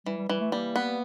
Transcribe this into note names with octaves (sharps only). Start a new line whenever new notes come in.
E3 G3
G3
E3 G3
A3
G3 A#3
B3